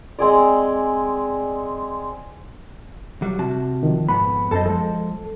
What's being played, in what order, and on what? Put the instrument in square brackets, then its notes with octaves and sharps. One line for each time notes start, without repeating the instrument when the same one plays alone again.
[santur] G#3 C4 G#4 D5
[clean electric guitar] F#3 G3
C3 F#4 A5
[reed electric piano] D#3 F3
[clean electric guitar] F2 G#2 B3 [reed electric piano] B5
[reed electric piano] F#2 A5 [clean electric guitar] A4 C5 D#5
[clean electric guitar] F3 G#3 [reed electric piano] A4